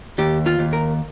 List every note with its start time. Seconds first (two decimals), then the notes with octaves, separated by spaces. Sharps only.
0.18 D#2 G4
0.46 F4
0.59 D#2
0.73 A#4